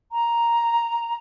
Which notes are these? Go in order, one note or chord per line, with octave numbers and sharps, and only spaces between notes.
A#5